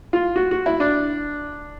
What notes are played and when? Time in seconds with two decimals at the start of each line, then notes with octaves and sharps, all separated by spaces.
0.13 F4
0.36 F#4
0.51 F#4
0.66 E4
0.80 D4